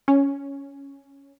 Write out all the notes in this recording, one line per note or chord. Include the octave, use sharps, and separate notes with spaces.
C#4